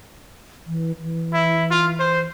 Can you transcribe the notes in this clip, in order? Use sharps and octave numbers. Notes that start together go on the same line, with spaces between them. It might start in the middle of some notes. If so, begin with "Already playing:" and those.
E3
E3
E4
F4
C5